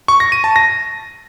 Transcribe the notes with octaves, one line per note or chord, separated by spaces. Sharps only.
C#6
A#6
D#7
A5
A#6